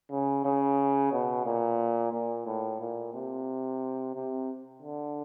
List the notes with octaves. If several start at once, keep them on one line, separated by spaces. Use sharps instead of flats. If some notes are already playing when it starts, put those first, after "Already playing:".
C#3
C#3
B2
A#2
A#2
A2
A#2
C3
C3
D3